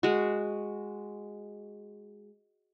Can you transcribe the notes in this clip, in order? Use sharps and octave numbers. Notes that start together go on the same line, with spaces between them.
G#3 F#4